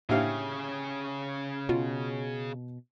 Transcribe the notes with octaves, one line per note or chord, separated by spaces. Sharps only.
A2 C#3 A#3 D4 E4 G4 G#4 F5
B2 F4